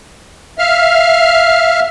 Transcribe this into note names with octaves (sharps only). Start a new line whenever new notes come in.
E5 F5 F6